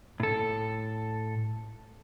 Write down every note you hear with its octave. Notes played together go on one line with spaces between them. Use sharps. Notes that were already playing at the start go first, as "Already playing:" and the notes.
A2 A4